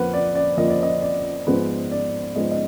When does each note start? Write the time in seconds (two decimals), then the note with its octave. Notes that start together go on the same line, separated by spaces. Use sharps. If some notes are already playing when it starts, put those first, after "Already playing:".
Already playing: F2 F3 A#3 B4 F#5
0.13 D5
0.35 D5
0.57 F2 F3 A#3 D#5
0.70 D5
0.83 D#5
1.02 D5
1.47 G#2 F3 G#3 B3 B4
1.91 D5
2.35 G#2 F3 G#3 B3 D#5
2.51 D#5